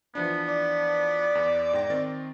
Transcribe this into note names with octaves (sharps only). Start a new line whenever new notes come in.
E3 F3 B3 D4
D5
E2
G#2 G5 A#6
D#3 C4 A6